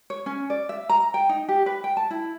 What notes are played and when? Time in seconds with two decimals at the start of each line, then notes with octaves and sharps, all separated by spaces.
0.10 C#5
0.26 C#4
0.50 D5
0.69 E5
0.89 A#5
1.14 G5
1.29 D#4
1.49 G4
1.66 B4
1.84 G5
1.97 A5
2.11 E4